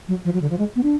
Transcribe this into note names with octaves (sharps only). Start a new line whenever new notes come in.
F#3
F3
F#3
D3
F3
G#3
B3
D4